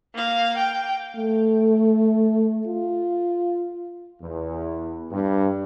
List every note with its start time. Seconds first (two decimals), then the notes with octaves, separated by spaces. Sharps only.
0.15 A#3 F5
0.57 G5
1.16 A3
2.67 F4
4.22 E2
5.12 G2